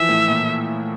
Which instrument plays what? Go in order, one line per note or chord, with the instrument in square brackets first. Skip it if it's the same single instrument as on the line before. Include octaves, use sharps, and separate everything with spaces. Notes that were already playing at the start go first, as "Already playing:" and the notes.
Already playing: [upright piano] E3 F3 [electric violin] E5
[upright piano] A2
A#2